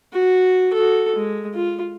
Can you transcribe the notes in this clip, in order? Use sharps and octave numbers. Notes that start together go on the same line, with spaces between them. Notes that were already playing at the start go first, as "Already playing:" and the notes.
F#4
F#4 A4
G#3
F4